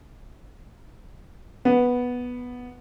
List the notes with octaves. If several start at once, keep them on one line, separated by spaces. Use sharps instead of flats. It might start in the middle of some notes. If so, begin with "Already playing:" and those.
B3